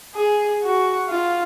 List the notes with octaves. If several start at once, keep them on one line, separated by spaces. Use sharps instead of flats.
G#4
F#4
F4